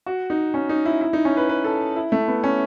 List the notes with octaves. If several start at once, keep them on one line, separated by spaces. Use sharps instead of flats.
F#4
D#4
C#4
D#4
E4
E4
D#4
C#4
B4
B4
A4
E4
A3
B3
C#4